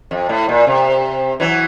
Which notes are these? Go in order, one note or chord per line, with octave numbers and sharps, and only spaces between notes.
F2
A2
A#2
C3
E3 F#3